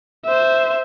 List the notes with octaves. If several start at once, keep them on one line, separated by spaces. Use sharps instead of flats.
C5 E5